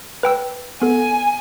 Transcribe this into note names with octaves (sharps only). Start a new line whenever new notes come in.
B4 G5 E6
B3 A4 G#5